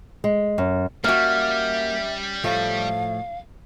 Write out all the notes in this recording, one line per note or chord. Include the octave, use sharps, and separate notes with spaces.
G#3
F#2
G3 A#3 C#4 F#4 E5
A2 F3 A3 F5